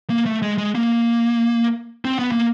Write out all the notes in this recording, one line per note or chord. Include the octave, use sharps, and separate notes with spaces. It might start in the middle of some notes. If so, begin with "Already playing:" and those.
A#3
A3
G#3
G#3
A#3
C4
B3
A#3